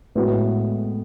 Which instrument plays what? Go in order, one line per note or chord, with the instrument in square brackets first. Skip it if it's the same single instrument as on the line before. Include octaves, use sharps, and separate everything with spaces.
[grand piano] A2 G#3 B3 F#4